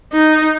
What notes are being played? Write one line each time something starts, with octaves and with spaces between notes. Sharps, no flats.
D#4